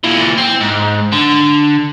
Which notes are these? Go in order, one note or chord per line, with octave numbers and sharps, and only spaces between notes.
A#2 E3
C4
G#2
D3